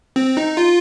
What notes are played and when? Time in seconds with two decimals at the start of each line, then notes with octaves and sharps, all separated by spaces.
0.16 C4
0.37 D#4
0.57 F4